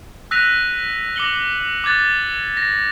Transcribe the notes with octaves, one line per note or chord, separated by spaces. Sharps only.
E6 F#6 A#6 B6 D#7 F7
D6 A#6 C#7 F#7 G7
D6 F#6 G#6 A6
A#6